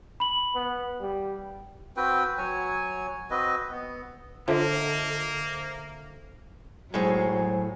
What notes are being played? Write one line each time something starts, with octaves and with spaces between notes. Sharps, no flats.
B5 F#7
B3
G3
C4 F#4 B4 G5
F#3 C#5 G#5
C4 F#4 B4 D#5
B3
D3 A#3 F4 C5 D#5 E5
A2 F#3 G#3 C5 G#5